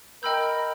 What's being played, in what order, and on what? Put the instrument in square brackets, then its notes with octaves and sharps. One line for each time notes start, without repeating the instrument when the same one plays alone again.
[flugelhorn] A#4 [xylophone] D#5 G5 B5 E6 G6